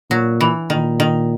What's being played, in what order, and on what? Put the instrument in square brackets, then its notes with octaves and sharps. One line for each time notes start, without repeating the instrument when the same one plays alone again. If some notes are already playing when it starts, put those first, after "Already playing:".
[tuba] A#2 [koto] F#3
[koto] E3
[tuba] A#2 [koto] D#3
[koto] D#3